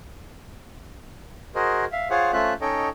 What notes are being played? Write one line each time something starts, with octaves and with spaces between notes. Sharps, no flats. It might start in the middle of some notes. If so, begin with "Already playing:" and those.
F#4 G#4 A#4 C5 D#5
E5 F5
F4 G#4 C5 C#5 F5 F#5
A3 C#4 F4 C5 E5 F#6
C#4 D#4 A4 C#5 D#5 G5